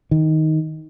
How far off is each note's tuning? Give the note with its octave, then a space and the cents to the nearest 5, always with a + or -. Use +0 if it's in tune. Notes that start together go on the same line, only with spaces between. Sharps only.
D#3 +10